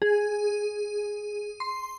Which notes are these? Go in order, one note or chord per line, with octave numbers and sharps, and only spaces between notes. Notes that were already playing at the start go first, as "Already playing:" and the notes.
G#4
C6